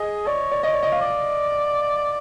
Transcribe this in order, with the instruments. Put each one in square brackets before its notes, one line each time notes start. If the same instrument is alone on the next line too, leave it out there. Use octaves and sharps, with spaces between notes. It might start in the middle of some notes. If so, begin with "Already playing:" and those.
Already playing: [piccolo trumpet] G#4 [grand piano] D#5
[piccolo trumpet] C#5 [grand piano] D5
[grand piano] D5
[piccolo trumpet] C#5 [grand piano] D#5
[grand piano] D5
D#5
F5
[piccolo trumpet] D5